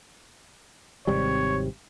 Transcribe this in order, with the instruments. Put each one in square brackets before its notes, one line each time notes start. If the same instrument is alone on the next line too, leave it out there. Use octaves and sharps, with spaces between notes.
[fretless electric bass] G#1 C3 G3 [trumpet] C#5